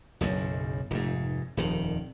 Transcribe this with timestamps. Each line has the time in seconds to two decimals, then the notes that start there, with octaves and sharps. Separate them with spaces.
0.21 F#1 B1 F#2
0.91 F1 G#2
1.57 D#1 F2 D#3